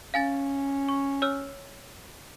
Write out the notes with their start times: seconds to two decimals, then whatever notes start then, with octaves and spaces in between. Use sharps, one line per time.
0.14 C#4 F5 G#5 A6
0.89 C#6
1.22 C#5 E6 F6